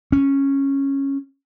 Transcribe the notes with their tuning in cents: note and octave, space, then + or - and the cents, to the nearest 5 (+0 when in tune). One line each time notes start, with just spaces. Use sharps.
C#4 -10